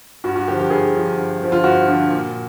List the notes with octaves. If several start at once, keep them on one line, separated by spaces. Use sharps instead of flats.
G2 F#4
F#4
D3 F3 G4
G4
G2 G#4
D3 F3
G2
D3 F3
F4
G2 F#4
D3 F3
A#2